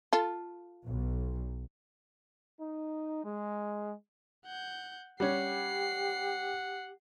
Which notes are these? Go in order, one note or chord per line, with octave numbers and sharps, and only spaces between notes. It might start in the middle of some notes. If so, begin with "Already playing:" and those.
F4 A4
B1
D#4
G#3
F#5 G6
G3 C#4 G4 F#5 C7